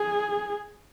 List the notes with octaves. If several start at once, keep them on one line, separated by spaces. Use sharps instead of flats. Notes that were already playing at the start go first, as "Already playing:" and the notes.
Already playing: G#4